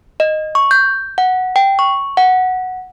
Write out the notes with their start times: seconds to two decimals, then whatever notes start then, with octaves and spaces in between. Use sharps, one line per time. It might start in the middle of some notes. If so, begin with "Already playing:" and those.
0.20 D#5
0.55 C#6
0.71 G6
1.18 F#5
1.56 G5
1.79 C#6
2.17 F#5